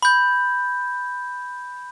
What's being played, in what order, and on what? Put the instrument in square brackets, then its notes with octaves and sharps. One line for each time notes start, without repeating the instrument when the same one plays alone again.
[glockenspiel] B5 G6